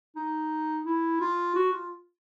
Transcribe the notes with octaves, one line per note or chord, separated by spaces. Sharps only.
D#4
E4
F4
F#4
F4